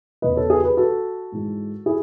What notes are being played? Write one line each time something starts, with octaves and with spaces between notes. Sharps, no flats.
E2 C#3 E3 B4 D#5
A4 C#5
G#4 B4
G#4 B4
F#4 A4
G#2 E3 G#3
E4 G#4